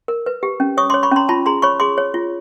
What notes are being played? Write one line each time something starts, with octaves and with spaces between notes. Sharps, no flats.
A#4
B4
G4
C#4
C#5 C#6 D#6
C#5 C6 D6
B5 C#6
C#4 A#5 C6
F4 A5 B5
G#4 A#5 C6
C#5 B5 C#6
G#4 C6 D6
C#5
F4